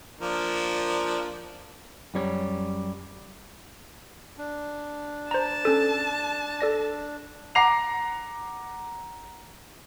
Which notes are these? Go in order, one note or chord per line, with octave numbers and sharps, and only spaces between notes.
F3 A#3 D4
F#2 G3 C#5
D4
C5 A5 A#5
C#4 A4
A4 D5 A#6
F#5 A#5 D6 A#6 C7 F7